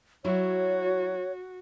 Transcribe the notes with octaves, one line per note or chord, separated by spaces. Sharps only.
F#3 E4 F#4 C#5